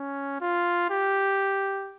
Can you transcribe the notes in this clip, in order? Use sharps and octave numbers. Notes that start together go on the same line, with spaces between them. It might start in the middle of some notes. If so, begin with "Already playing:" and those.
Already playing: C#4
F4
G4